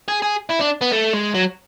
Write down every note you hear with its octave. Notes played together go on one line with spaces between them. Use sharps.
G#4
G#4
E4
D4
B3
A3
G#3
F#3